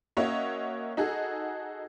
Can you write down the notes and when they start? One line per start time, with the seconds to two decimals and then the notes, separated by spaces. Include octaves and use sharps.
0.17 A#3 C#4 F#4 C#5 D#5 E5
0.97 D#4 F#4 G#4 A4